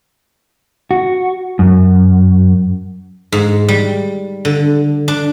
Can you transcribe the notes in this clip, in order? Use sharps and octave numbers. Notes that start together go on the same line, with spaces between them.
F#4
F#2
G#2
G3
D3
D4